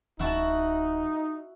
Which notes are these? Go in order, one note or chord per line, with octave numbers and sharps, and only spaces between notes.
D1 E3 D#4 E4 F#4 A5